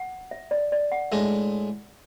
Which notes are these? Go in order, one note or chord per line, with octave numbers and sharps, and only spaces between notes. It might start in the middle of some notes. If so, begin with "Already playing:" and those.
Already playing: F#5
E5
D5
D5
F#5
A2 G#3 D4 E5